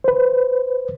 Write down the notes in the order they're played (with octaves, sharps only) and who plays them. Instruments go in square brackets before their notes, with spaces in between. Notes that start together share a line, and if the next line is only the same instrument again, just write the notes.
[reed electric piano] B4 C5